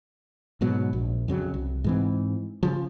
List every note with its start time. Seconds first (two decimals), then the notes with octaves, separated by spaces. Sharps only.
0.61 G#2 B2 F#3
0.93 A#1
1.28 F2 C#3 F#3
1.54 C2
1.84 G#2 E3 C4
2.63 C#3 F3